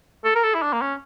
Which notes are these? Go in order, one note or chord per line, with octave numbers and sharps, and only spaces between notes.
A4
A#4
A4
E4
D4
A#3
C#4